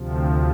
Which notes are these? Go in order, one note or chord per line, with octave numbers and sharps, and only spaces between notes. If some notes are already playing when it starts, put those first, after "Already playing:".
Already playing: D2 C3 F3
G4